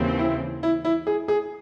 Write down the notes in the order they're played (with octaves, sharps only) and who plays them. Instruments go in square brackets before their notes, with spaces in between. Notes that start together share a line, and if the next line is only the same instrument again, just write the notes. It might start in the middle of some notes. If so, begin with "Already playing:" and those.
Already playing: [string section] D#2 C#3 E3 C4
[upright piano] E4
E4
E4
G#4
G#4